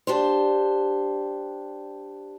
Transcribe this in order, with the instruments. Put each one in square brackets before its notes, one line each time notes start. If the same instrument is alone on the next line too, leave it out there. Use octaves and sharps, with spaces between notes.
[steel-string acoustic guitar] D4 G4 C5